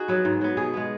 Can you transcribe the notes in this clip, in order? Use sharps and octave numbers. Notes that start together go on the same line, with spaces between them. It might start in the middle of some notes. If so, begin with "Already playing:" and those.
Already playing: D#4 F#4 G#4
F#3 B3
G#2
F#3 B3
B2 G#4
G#3 B3